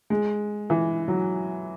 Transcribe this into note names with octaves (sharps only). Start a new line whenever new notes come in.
G#3
E3
F#3